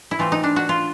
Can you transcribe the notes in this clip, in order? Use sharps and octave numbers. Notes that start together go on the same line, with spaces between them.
E4
E3 A3 C4 F4
D#4
D4
F#4
F4